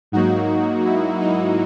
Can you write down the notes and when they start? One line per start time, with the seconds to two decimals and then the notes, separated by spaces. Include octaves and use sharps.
0.12 G#2 F#3 A#3 D#4 F#4
0.85 E4
1.21 D#4